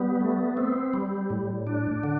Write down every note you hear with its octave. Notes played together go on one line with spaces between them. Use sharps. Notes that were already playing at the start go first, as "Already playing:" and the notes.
Already playing: G3 B3
A3
C4
G3
A2
D4
D3